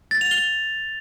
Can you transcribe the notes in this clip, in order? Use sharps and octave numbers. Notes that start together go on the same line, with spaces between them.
A6
F7
G7